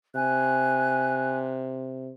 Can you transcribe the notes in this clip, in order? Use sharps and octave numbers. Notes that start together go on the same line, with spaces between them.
C3 G#5 F#6